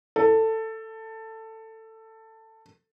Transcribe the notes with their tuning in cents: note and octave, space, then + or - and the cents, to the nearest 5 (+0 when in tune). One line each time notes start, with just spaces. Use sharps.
A4 +15